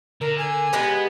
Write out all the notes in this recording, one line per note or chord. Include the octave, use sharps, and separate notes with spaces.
D3 A#4
G#5
G#3 B3 G4 B4